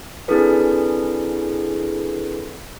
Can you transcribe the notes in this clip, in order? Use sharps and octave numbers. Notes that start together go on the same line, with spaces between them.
C4 D4 E4 G#4 A4 B4